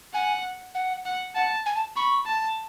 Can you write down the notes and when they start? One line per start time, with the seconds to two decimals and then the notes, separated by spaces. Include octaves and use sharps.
0.14 F#5 G#5
0.75 F#5
1.06 F#5
1.35 F#5 A5
1.66 G#5
1.76 A5
1.96 B5 C#6
2.26 A5